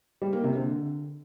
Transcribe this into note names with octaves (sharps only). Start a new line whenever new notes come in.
G3
A#3
C3
D3